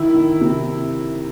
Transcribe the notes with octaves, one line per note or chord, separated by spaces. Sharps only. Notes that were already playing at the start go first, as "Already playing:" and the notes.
Already playing: D#3 E4
D#3
C3